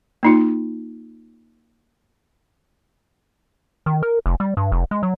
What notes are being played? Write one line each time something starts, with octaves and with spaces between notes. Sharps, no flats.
A#3 D#4 F4
D#3
A#4
F1
G3
G2
F1
G#3
F#3